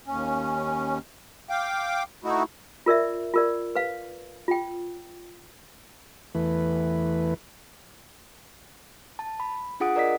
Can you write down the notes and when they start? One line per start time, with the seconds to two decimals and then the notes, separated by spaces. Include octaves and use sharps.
0.07 D#2 C#4
1.50 F5 G5 D6
2.24 A3 D#4 E4 F#4
2.86 F4 A#4 D5 E5
3.34 F4 A#4 D5
3.76 B4 F5
4.48 F4 G5
6.35 E2 E3 A3 B4
9.19 A5
9.40 B5
9.80 D4 F4 G#4 F#5 D#6 D7
9.96 A#4 D5 D#5 B6